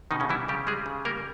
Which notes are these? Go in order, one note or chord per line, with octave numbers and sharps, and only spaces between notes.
B2 D#3 D#4
C#3 C#4
E3 G3 E4
C#3 G3 G4
G3 G#3 G#4
C#3
G3 A#3 A#4